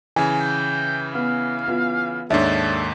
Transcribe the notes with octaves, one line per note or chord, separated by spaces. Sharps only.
C#3 E3 G#5
G5
B3 F5
B3 F4
D#2 G#2 D4 A4 C#5 E5